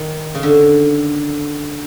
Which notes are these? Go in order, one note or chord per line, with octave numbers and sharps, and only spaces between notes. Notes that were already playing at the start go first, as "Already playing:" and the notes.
Already playing: D#3
C#3
D3